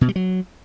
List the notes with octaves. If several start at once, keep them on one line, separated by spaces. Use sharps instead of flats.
B2
G3
F#3